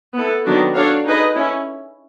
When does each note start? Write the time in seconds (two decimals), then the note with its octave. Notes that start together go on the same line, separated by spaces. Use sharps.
0.14 B3 E4 A4
0.45 D#3 F#3 B3 D4 F#4
0.74 D4 F#4 A4 C#5 F5
1.05 D#4 G#4 B4 D#5
1.35 C#4 E4